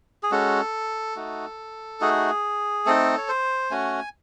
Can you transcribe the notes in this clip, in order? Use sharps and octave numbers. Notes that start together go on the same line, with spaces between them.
G#4
G#3 C#4 F#4 A4
A3 D#4 F#4
A3 D#4 F#4 G#4
A3 C4 D#4 A4
C#5
C5
A3 C#4 F#4 G#5